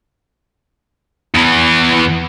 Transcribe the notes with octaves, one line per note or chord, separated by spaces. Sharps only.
E2 E3